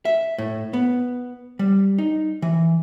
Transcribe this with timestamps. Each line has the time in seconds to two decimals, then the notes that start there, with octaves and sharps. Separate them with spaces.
0.05 E5
0.38 A2
0.73 B3
1.59 G3
1.98 D#4
2.42 E3